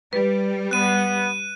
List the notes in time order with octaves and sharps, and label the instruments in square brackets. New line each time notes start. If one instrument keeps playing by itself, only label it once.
[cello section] G3 [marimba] B4
[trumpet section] B3 [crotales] F#6 D#7